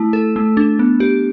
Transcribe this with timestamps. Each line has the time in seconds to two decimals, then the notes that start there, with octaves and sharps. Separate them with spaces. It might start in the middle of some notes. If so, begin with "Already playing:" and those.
Already playing: A3 E4
0.13 A4
0.36 A3
0.57 D4
0.79 B3
1.00 G4